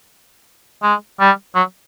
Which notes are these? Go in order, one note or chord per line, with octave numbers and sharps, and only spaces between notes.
G#3
G3
F#3